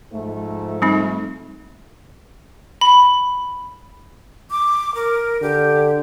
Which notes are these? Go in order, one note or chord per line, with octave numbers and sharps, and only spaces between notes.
G#2 F3 A3
G3 C4 D#4
B5
D6
A#4
D3 G4